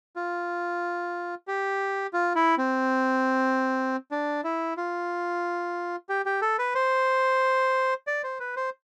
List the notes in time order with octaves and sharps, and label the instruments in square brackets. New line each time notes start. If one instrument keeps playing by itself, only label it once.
[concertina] F4
G4
F4
E4
C4
D4
E4
F4
G4
G4
A4
B4
C5
D5
C5
B4
C5